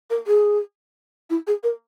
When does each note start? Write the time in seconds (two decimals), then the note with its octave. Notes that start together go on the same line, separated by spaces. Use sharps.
0.10 A#4
0.27 G#4
1.30 E4
1.47 G#4
1.63 A#4